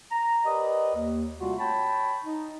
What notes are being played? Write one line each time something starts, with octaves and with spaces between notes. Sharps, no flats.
A#5
G4 A#4 B4 D5 D#5
D#2
C3 G3 A3 C4 F4 F#4
C#5 G5 A5 B5
D#4